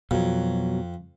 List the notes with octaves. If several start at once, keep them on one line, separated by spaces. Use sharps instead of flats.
F2 B2 F#3